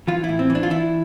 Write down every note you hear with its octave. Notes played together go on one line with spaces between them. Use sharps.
E3 F4
A2 E4
C4
E3
D4
F4
E3 E4